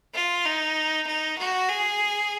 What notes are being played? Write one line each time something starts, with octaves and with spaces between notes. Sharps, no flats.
F4
D#4
D#4
F#4
G#4